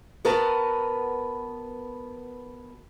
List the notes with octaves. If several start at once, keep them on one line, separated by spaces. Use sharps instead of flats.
B3 F#4 A#4 B4 A5